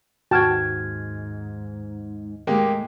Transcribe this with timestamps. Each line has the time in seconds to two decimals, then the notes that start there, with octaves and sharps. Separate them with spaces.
0.31 D#2 G#2 F#4 G5 A5 F6 G#6
2.47 A2 G#3 A#3 G4